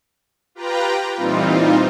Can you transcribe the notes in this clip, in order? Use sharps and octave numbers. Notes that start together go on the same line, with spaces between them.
F4 G4 B4 G5 A#5
A#2 E3 G3 C4 D#4 F4